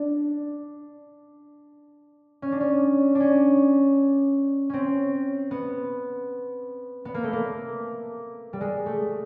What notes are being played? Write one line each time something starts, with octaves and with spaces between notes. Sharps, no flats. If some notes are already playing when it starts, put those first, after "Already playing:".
Already playing: D4
C#4
D4
C#4
D4
C#4
C4 C#4
B3
B3
A#3
A3
A#3
G3
G#3
A3